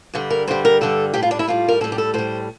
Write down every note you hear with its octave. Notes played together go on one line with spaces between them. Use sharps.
G2 D3 G3
A#4
G2 D3 G3 C5
A#4
G2 D3 G3 A4
A2 G3 G4
F4
D4
E4
A2 G3 F4
A#4
A2 G3 A4
G4
A4
A2 G3 C5